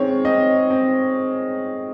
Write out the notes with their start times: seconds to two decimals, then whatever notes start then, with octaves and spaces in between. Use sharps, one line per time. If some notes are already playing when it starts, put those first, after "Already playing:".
Already playing: D#3 G#3 C4 C#5
0.25 C4 D#5
0.70 C4